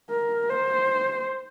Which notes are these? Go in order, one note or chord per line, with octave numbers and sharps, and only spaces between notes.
A#4
C5